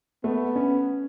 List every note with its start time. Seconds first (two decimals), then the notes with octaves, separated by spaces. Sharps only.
0.24 A3 B3
0.56 C#4